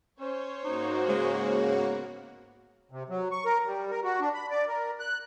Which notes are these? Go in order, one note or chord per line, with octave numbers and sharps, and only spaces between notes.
C#4 C5 C#5
G#2 A#3 D#4 F#4
C#3 G#3
B3
C3
F#3
C#6
A#4
G3
A#4
F#4
D4
B5
D5
A#4
F#6